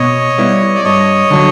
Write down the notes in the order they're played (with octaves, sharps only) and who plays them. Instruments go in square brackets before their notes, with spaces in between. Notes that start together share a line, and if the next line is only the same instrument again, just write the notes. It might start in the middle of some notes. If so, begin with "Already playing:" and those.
Already playing: [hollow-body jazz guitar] B2 [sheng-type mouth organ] C#5 D#5
[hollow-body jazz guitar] G3 B3 E4
[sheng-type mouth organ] D5
[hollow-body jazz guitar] G2 [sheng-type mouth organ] C#5 D#5
[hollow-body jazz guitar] D3 F#3